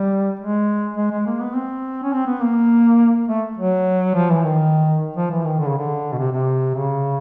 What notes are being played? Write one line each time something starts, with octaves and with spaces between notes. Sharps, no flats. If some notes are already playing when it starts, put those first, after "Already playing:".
Already playing: G3
G#3
G#3
G#3
A#3
B3
C4
C#4
C4
B3
A#3
A3
F#3
F3
E3
D#3
F3
E3
D#3
D3
C#3
D3
B2
C3
C3
C#3